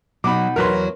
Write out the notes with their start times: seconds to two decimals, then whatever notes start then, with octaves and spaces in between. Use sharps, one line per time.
0.24 B2 F#3 D#4 B5 D6
0.56 E2 F#3 A#4 B4 C6